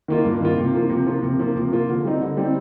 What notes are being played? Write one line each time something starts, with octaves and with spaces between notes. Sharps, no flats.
D#3 A#3 F4
G2
D#3 A#3 F4
C3
F3 A#3 F4
C3
F3 A#3 F4
C3
F3 A#3 F4
C3
F3 A#3 F4
D3
G3 C4 D#4
D3
G3 C4 D#4